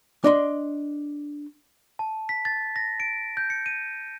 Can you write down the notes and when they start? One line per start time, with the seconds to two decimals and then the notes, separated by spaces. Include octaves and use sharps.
0.24 D4 D#5 C6
1.99 A5
2.29 B6
2.45 A6
2.76 A#6
3.00 D7
3.37 G6
3.50 C#7
3.66 D#7